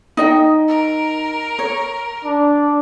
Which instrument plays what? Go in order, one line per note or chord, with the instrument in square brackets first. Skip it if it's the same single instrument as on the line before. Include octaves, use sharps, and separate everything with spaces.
[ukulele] D#4 D#5 G5
[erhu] A#4
[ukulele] C#5
[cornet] D4